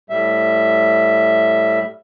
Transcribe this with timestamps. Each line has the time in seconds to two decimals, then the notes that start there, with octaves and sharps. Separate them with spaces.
0.10 A2 G3 E5